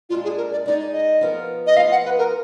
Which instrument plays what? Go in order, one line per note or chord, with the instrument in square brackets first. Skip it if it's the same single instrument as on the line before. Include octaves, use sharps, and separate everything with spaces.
[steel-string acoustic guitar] A#2 G#3 D4 [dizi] F4
[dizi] G#4
A#4
D5
[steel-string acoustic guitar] G#3 D#4 G#4 [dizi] D5
[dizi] D#5
[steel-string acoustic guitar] F3 B3 F4 A#4
[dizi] D#5
[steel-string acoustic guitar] F3 B3 F4 G#4 [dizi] F5
[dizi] F#5
B4
A#4